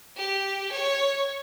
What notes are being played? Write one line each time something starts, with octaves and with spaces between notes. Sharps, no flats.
G4
C#5